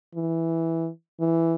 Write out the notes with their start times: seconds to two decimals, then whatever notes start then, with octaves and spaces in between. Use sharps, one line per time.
0.15 E3
1.20 E3